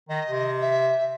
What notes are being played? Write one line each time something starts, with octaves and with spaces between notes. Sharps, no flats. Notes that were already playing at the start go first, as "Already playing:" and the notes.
D#3 D#5
C3
E5